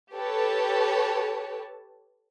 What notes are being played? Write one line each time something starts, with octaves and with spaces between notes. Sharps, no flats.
G4 A4 B4 C#5 A5